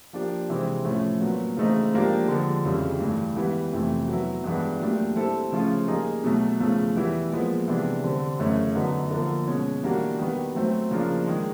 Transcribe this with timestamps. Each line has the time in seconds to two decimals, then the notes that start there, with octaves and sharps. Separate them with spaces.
0.13 F3 A#3 D4 G4
0.49 C3 E3 G#3 C4
0.85 A2 F3 A3 C#4
1.21 A#2 F#3 B3
1.57 C#3 E3 A3 C4 D#4
1.93 G#2 F3 A#3 D4 G4
2.28 D3 F3 G#3 C4
2.65 F2 C#3 E3 G3
3.00 G2 E3 A3
3.36 G#2 E3 G3 B3
3.72 F2 C3 E3 A3
4.08 F#3 B3 E4
4.44 G2 E3 G#3 B3 D4
4.80 A#2 F#3 A3 D4 G4
5.16 G3 C4 E4 A4
5.52 C#3 F3 A3 C#4 F4
5.87 G3 A#3 D#4 G#4
6.24 B2 F#3 A3
6.60 E2 C#3 F3 A3
6.96 E3 G3 B3 E4
7.32 A#2 F3 G#3 B3
7.68 C3 E3 G#3 B3 D4
8.03 D3 G3 C4
8.39 F#2 C#3 E3 A3 C#4
8.75 D3 F#3 B3 D#4
9.11 D3 F3 A#3
9.47 B2 G#3 C#4
9.83 E3 G3 A#3 D4 F#4
10.19 D#3 G3 B3
10.55 F#3 A3 C4
10.91 C#3 F3 A#3 D4
11.27 D#3 G#3